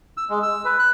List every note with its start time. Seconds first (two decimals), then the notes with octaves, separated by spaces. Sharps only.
0.17 E6
0.30 G#3
0.43 E6
0.65 B4
0.79 F#6